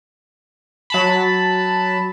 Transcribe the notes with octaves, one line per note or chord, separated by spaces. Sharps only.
F#3 A5 B5